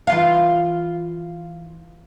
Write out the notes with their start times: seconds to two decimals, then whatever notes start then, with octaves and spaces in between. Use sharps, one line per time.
0.07 E3 F4 F5